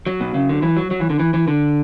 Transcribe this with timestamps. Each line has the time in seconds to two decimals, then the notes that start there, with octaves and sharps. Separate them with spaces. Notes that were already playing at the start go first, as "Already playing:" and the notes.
0.06 F#3
0.21 B2
0.34 C#3
0.49 D3
0.62 E3
0.77 F#3
0.91 F#3
1.00 E3
1.10 D3
1.19 E3
1.34 E3
1.48 D3